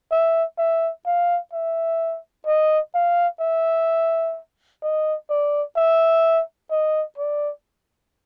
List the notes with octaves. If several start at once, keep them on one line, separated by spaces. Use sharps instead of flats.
E5
E5
F5
E5
D#5
F5
E5
D#5
D5
E5
D#5
D5